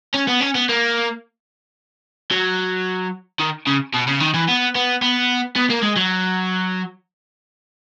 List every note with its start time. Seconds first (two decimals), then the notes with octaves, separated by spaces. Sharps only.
0.14 C#4
0.28 B3
0.41 C#4
0.55 B3
0.69 A#3
2.31 F#3
3.40 D#3
3.67 C#3
3.94 B2
4.07 C#3
4.20 D#3
4.34 E3
4.48 B3
4.75 B3
5.02 B3
5.56 B3
5.70 A#3
5.83 G#3
5.97 F#3